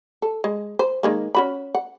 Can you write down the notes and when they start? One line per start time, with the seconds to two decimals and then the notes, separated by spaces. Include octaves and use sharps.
0.22 A4
0.44 G#3
0.79 C5
1.03 D#3 G#3 A#3
1.35 C#4 F#4 B5
1.75 F#5